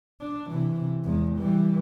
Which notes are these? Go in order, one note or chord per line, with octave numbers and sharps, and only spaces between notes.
D4
C3 E3
E2 G#3
E3 G3